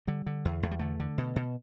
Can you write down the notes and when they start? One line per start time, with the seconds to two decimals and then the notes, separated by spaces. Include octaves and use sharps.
0.07 D3 G3
0.26 D3
0.45 E2
0.63 E2 A3
0.71 G3
0.79 D3 A3
1.00 D3
1.18 B2
1.36 B2